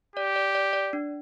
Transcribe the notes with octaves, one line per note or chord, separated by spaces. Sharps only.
G4 D5
D5
D5
D5
D4